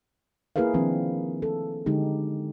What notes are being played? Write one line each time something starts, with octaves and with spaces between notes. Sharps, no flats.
A#3 E4 G#4 A#4 B4 F5
D#3 F3 C4 D4
A4
D3 G#3 D#4 G4